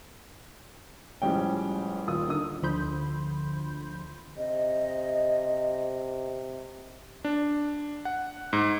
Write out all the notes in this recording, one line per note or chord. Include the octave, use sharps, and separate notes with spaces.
A1 F3 G3 G#3 C#4 G5
D#1 F4 D#6
D3 D#3 D#6
D2 D3 F3 B5 C6 G6
C3 D#5
D4
F#5
G#2